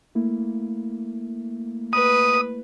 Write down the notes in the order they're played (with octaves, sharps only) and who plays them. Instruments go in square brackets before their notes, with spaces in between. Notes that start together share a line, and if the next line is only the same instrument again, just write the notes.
[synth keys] A3 A#3 E4
[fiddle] B4 [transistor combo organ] D#6